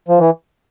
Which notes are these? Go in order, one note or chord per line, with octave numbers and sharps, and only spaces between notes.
F3
E3